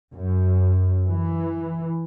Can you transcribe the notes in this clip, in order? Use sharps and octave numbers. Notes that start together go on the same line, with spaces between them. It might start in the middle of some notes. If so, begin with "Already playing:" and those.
F#2
E3